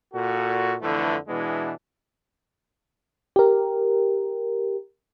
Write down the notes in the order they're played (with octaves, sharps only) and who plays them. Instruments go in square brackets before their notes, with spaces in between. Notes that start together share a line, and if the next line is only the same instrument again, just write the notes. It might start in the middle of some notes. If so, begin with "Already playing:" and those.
[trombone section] A#2 F#4 A4
F2 D3 E3 A3 B3 E4
B2 E3 G#3 B3 D4 E4
[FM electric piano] G4 A#4